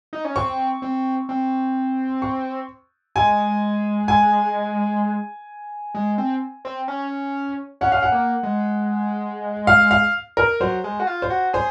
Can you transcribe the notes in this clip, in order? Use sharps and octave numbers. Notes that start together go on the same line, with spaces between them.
D#4
C#4
C4 C#6
C4
C4
C#6
G#3 G#5
G#5
G#3
C4
C4
C#4
C#4 F#5
F5
F#5
A#3
G#3
F5
F5
A#4
F#3 C5
G#3
F#4
F4
C5
F#4
G#4 C5